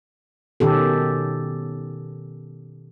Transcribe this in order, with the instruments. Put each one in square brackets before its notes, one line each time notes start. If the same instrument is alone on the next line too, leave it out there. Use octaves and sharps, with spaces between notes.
[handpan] B2 D#3 C#4 G4 A4